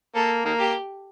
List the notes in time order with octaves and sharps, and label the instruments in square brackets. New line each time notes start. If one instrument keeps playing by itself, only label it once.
[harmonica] A#3 [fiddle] A4
[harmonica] D#3 A#3
[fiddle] G4